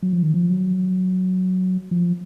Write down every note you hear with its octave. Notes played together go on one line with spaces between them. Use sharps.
F#3
F3
D#3
F3
F#3
F3